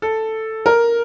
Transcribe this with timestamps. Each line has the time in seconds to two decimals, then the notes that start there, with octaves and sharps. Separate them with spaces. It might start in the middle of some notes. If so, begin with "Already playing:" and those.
0.02 A4
0.66 A#4